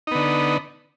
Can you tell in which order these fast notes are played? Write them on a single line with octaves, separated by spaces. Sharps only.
D#4 B3 D3